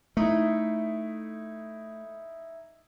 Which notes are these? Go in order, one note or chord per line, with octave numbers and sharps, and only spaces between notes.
A3 D#4 E4